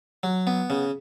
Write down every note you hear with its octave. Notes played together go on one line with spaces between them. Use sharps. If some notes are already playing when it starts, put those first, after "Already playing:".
F#3
B3
C#3